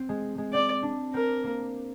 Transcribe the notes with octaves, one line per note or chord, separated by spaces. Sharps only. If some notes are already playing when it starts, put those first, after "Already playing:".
Already playing: C4
G#3
G#3
C4 D5
D4
C4 A#4
A#3